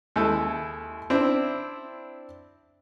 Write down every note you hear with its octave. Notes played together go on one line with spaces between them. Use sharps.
D#2 G#3 E4 A4
C4 D4 E4